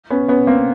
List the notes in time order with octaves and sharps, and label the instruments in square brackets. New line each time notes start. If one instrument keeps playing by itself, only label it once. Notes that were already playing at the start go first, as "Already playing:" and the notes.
[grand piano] B3 C#4
B3 C#4
A#3 C4